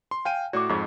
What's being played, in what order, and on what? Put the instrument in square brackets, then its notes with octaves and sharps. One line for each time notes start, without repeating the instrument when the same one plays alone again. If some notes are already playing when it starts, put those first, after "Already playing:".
[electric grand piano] C6
[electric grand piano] F5 G5 D#7 [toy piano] G#5
[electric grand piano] A2 F#4 [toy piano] D5 D6
[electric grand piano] F2 G#2 [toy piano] F4 G#4 D#5